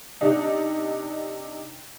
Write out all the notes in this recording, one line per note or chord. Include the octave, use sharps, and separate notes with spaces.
C3 D4 D#4